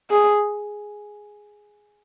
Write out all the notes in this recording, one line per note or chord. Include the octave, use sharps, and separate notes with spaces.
G#4